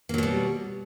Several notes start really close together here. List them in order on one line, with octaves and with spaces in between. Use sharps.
A#3 F#3 B2 G3